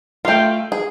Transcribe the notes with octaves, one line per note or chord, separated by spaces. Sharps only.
A3 F4 F5 G5
G#4